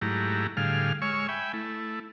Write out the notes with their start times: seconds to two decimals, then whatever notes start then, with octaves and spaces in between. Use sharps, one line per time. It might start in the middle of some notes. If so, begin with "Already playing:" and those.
0.01 G#2 F#3 A3 E4 G4 A#5
0.57 A2 D3 G3 G#4 F5 F6
1.02 G#3 C#5 C#6 E6 F6
1.29 E5 G5 G#5 B5
1.53 A3 E4